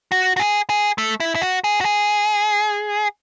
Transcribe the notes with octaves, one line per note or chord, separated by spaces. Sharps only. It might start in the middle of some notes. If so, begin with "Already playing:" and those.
F#4
F#4
G#4
G#4
A3
E4
E4
F#4
G#4
F#4
G#4